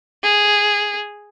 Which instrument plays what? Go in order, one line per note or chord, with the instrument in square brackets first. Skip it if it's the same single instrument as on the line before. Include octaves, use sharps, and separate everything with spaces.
[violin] G#4